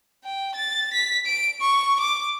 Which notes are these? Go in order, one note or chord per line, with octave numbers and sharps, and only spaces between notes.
G5
A6
B6
D7
C#6
D6